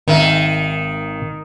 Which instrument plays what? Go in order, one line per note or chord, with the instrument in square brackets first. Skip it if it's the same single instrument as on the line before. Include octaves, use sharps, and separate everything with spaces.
[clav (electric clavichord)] G#1 E5 [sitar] D#3